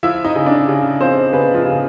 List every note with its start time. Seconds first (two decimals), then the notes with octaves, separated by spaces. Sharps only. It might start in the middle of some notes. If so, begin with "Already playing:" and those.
0.03 F3 E4 E5
0.24 D#4 D#5
0.35 C#3
0.46 D4 D5
0.68 C#3
1.00 F3 C4 C5
1.33 C#3 B3 B4
1.54 F3 F4
1.65 C#3